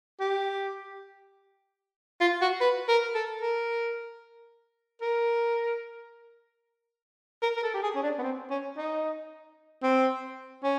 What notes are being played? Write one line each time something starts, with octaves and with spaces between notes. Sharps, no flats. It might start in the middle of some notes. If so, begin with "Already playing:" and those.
G4
F4
F#4
B4
A#4
A4
A#4
A#4
A#4
A#4
A4
G4
G#4
C#4
D4
B3
C4
C#4
D#4
C4
C#4